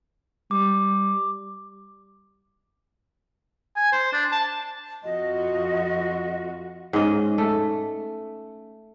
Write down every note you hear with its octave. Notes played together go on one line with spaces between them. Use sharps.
G3 D6
G#5
C5
D4
A5
F2 F4 F#4 D#5
G#2 C#4 D#5
A3